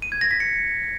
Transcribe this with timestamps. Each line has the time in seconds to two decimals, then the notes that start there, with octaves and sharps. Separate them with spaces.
0.02 D#7
0.12 G#6
0.21 A#6
0.31 B6
0.40 C#7